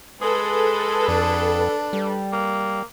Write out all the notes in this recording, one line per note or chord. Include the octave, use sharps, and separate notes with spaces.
G#3 G#4 A4 B4
F2 D4
G3
A#3